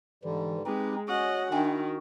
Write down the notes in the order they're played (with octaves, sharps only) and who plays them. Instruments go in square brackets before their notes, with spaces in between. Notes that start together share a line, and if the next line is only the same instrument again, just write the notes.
[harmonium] G#2 D3 G3 [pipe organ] E3
[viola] G#3 [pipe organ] C4 D#4 [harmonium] G4 B4
[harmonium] C#4 [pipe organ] F#4 [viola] D#5 F#5
[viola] D#3 [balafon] D4 G5 G#5 [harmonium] E4